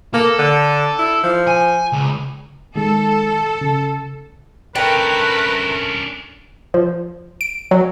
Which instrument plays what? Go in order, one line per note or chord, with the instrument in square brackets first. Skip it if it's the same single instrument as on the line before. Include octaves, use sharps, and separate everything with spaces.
[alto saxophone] A#3 [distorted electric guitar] A4
[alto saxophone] D3
E4
F3
[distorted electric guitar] G#5
C#2
[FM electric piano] D#3 G#3 [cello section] A4
[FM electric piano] C#3
[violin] A3 A#4 [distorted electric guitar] C#4 D4 [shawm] B4 [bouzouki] G5
[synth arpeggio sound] F3
D7
F#3